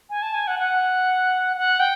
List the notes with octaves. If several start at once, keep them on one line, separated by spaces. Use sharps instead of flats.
G#5
A5
G#5
F#5
F#5
F#5
G5